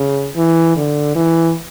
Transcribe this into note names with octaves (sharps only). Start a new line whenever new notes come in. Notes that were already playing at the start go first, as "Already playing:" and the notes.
Already playing: C#3
E3
D3
E3